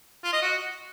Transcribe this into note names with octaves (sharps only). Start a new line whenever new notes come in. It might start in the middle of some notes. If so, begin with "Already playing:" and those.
F4
D#5
F#4